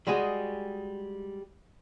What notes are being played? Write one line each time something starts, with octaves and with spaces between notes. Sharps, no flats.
G3 G#3 F#4 G#4